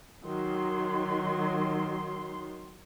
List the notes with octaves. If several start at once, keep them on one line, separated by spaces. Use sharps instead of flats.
D#3 F#3 C6